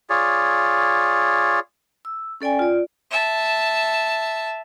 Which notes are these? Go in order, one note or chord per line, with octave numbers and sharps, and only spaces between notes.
F4 G#4 C#5 D5
E6
C#4 A4 D5 G5 G#5
F4 D5
E5 A5